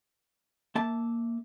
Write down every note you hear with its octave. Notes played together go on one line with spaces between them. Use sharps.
A#3 E5 A5